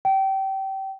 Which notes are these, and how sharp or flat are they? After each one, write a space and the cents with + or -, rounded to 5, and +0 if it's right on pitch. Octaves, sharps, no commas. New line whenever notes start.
G5 -25